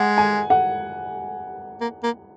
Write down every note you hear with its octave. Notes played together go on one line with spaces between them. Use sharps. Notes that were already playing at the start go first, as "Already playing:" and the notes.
Already playing: G#3 F#5
G#5
F#5
A#3
A#3